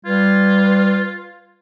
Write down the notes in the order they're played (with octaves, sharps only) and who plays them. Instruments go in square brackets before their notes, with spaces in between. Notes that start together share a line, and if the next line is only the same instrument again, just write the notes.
[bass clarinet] G3 [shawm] F4 [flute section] B4 G#6